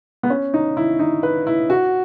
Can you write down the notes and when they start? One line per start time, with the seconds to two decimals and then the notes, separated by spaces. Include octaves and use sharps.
0.23 B3
0.30 C#4
0.54 D#4
0.77 E4
0.99 D#4
1.23 B4
1.47 E4
1.70 F#4